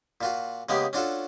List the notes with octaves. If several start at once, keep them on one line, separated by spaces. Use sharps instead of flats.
A#2 F4 F#4
C#3 G#3 A#3 B3 G4
C#4 D4 F4 F#4 A4